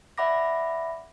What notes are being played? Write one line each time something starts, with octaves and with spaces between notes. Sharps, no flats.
D5 E5 F#5 B5 D6 A#6